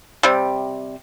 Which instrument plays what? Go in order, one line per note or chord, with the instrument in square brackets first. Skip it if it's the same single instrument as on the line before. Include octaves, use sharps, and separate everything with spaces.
[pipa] C3 G3